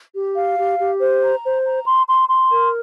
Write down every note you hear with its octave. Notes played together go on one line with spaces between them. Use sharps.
G4
F5
G4
G4
C5
A#5
C5
A#5
C6
C6
C6
A#4